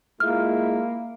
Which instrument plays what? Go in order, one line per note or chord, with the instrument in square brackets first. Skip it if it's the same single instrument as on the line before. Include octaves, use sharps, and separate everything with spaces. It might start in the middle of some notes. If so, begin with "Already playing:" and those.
[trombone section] G#3 E4 F4 [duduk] A#3 [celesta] F6